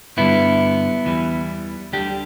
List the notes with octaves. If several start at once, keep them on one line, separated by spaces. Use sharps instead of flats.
G2 D3 G3 B3 E4
E2 E3 G3
D2 D3 G3 D4 G4